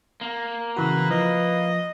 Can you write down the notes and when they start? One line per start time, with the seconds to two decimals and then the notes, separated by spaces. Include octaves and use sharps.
0.21 A#3
0.77 C#3 E3 F#4 B4
1.11 F3 B4 D#5